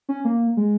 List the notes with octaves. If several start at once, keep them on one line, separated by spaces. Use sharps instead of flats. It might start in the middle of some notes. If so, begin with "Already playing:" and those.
C#4
A#3
G#3